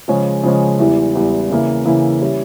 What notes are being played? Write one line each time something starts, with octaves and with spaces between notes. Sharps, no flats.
C#3 F3 G#3 C#4
C#3 F3 G#3 C#4
E2 E3 G3
E2 E3 G3
C#3 E3 A#3 E4
C#3 E3 A#3 E4
G3 C#4 E4